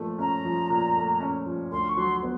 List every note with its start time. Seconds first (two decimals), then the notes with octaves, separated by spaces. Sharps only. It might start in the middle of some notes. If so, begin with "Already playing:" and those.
Already playing: A#2 F3 A3
0.18 C#4 A#5
0.45 F3
0.70 A#2
0.96 A3
1.20 C#4
1.46 F3
1.72 D2 C6
1.89 C#6
1.97 F#3 C6
2.22 B3